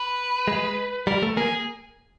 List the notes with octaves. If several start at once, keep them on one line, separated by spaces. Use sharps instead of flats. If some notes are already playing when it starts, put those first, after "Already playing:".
Already playing: B4
G#3
G3 A#4
A3
A#3 G#4